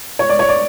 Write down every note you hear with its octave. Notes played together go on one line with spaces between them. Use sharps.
C#5
D5
C#5
D5